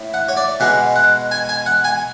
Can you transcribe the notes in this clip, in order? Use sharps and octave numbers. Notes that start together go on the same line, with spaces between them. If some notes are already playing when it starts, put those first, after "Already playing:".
Already playing: A2
F#5
C#5
D5
B2 G#3 F#5
F#5
G#5
G#5
F#5
G#5